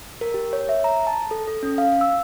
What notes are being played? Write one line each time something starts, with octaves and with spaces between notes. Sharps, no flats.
A#4
G4
C#5
E5
A#5
A5
A4
A4
C#4
F5
E6